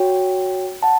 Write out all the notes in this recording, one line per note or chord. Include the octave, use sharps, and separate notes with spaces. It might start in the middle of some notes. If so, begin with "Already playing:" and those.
Already playing: F#4 C#5 G5
F#5 A5